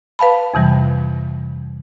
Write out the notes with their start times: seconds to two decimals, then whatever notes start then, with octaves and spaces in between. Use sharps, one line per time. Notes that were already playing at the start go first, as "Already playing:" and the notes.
0.19 B4 F5 A5 B5
0.54 F2 C3 E3 G3